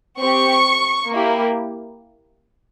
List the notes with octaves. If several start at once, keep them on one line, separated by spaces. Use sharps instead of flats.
C4 G4 C#6
A#3 E4 G4